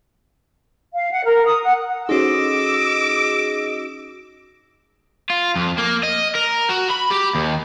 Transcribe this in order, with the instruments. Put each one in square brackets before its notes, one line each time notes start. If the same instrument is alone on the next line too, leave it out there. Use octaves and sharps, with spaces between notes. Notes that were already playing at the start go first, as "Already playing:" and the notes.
[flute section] F5
F#5
A#4
D#6
F#5
[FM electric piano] C#4 G#4 [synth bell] D#4 F#4 [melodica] D#5 [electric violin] D6 E6
[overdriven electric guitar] F4
F2
A#3
D#5
A#4
F#4
B5
G4
D#2